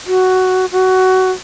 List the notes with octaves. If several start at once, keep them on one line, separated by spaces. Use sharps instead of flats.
F#4
F#4